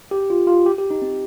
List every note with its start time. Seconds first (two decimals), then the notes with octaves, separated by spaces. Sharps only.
0.11 G4
0.30 F4
0.47 F4
0.66 G4
0.78 G4
0.91 D#4
1.02 C4